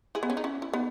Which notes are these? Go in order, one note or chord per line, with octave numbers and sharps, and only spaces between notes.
E4 G#4
B3
C#4
D#4
C#4 E4
E4
B3 D#4